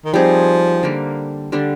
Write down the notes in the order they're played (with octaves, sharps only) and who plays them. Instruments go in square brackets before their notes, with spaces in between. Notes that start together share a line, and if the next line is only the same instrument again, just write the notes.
[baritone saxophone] D#3
[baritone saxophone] F3 [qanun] G3 C4 D#4 G#4
[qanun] D3 G3 A#3
D3 G3 D4